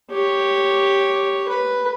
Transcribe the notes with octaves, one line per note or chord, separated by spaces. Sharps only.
G4 C#5
B4